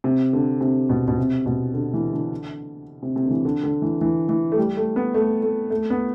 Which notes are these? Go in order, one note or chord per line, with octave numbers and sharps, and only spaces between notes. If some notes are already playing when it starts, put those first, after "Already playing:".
C3
D3
C3
B2
B2
C3
B2
D3
E3
D3
C3
C3
D3
E3
D3
D3
E3
E3
E3
A3
G3
A3
B3
A3
A3
A3
B3